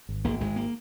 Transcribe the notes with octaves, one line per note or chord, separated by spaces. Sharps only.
G#1
G#1 A#3
G#1 G#3
A#3